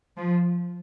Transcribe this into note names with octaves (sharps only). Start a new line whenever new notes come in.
F3